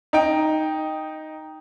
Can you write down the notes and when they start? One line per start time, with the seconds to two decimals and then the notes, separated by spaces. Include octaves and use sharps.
0.13 D#4 G5